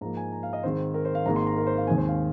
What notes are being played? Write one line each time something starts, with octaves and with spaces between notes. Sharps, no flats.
G#2 F3 A#3 A#5
G#5
A#5
F5
D#5
G#2 D#3 C4 C5
A#4
C5
F5
G#1 G#2 D#3 A#3 A#5
C6
A#5
A#4
C5
F5
D#2 D#3 G#3 C4 G#5
C5
F5